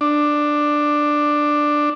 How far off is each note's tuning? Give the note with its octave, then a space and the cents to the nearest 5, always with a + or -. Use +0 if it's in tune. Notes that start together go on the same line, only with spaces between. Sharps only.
D4 +10